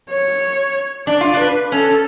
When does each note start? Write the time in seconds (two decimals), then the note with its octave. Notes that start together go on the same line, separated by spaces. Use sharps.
0.11 C#5
1.07 D4 D5
1.21 F4
1.34 D4
1.40 B4
1.72 C#4 A4